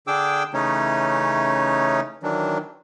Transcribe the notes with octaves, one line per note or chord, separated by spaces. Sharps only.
D3 D4 G#4 G5 D6 E6
C#3 E3 A3 C#4 D#4 C#5
D#3 E3 F#3 D4